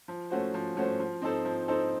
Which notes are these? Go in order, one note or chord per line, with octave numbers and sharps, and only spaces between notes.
F3
A3 C#4 F#4 C5
F3
A3 C#4 F#4 C5
F3
C4 D#4 A4 C5
F3
C4 D#4 A4 C5